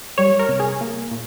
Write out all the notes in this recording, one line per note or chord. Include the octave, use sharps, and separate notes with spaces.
G3 C#5
A#4
C2
G#4
A#3
A#2